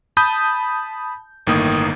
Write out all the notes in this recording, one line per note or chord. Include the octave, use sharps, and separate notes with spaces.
A5 B5 D#6 G6
G1 A2 D#3 A#3 D#6